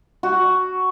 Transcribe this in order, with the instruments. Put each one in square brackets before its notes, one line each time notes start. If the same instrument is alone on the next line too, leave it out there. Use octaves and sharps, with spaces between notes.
[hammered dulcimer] F#4